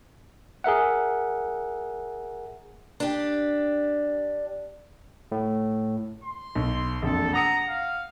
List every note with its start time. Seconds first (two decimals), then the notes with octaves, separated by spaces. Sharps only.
0.64 G#4 A#4 E5 F#5
3.00 D4 G4
5.32 A2
6.24 C6
6.55 B1
7.02 E1 A#1 F2 A4
7.33 F#5 A#5 D#6 C#7
7.69 F5